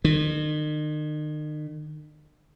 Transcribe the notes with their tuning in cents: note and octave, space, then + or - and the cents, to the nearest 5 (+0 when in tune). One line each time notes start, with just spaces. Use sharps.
D#3 -40